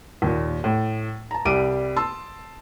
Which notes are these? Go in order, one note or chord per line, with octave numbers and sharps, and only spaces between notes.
D#2 A#2
A2
A5 A#5
C2 G3 D5 D6 D7 D#7
A5 C6 E6